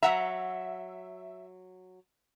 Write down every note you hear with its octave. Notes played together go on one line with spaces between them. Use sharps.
F#3 E5 F#5 A#5